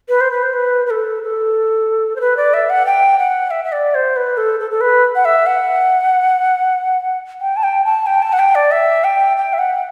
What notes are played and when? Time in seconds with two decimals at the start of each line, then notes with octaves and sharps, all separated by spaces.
0.09 B4
0.21 C5
0.31 B4
0.43 C5
0.54 B4
0.86 B4
0.91 A4
1.23 A4
2.16 C5
2.21 B4
2.37 D5
2.54 E5
2.70 F#5
2.86 G5
3.19 F#5
3.51 E5
3.64 E5
3.72 D5
3.95 C5
4.16 B4
4.37 A4
4.60 A4
4.71 A4
4.81 B4
5.16 F#5
5.25 E5
5.46 F#5
7.41 G5
7.57 A5
7.63 G5
7.85 A5
8.07 G5
8.22 A5
8.33 F#5
8.39 G5
8.55 D5
8.71 E5
9.04 G5
9.37 G5
9.53 E5
9.59 F#5